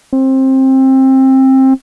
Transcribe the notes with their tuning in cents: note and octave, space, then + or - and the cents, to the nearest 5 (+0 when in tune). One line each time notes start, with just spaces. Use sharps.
C4 +20